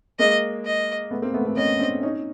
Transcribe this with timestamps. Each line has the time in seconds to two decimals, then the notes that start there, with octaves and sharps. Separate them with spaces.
0.19 G#3 A#3 D#5
0.66 D#5
1.11 A3 B3
1.22 A#3 C4
1.34 A3 B3
1.45 A3 B3
1.56 B3 C#4 D#5
1.80 C4 D4
2.03 C#4 D#4